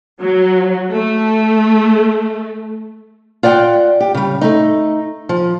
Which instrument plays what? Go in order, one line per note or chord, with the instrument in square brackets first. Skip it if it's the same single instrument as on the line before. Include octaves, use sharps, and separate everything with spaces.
[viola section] F#3
A3
[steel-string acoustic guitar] F4 D5 F#5 G5
G4
C#3 G3
A3 D#4
F3